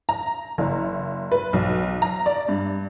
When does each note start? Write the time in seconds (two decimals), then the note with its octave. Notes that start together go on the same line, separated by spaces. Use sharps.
0.09 A#5
0.58 F#1
1.32 B4
1.53 B1
2.02 A#5
2.26 D5
2.48 G2